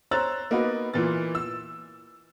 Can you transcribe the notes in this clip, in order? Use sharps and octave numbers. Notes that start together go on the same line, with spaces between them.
C5 C#5 A#5 E6 F#6 A6
A#3 B3 D#4 F#4 B4
A#2 E3 F4 A6
E6